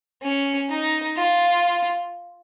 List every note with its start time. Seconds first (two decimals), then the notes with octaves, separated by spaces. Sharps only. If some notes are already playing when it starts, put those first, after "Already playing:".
0.22 C#4
0.70 D#4
1.17 F4